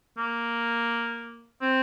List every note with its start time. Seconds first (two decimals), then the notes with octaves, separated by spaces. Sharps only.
0.18 A#3
1.61 C4